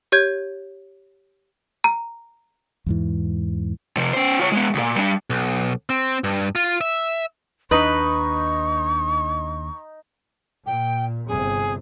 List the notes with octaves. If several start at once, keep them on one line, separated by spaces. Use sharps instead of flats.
G4 C#5 G6 G#6
A#5
E2 G#2 E3
C3 F3
C#4 C5
F4 C#5
G#3 B3
D2 A#2
G3 D4
B1
C4
G2
F4
E5
D#2 D4 D#4 B4 C#6
A#2 G5
G1 C3 G#4